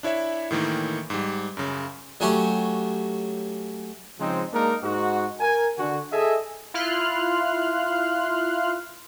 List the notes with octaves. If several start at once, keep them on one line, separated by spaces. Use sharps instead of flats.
D4 E4 C#5 E5
A2 D#3 E3 A#3
G#2 G3
F#2 C#3
F#3 A3 C#4 F#4 G4
C#3 F3 G#3 C4 D#4
G#3 A#3 D4 D#4 A#4
G#2 D#4 F#4
A#4 G#5
D3 F#4
G#4 A4 D#5 E5 G#5
E4 F4 C6 F6 F#6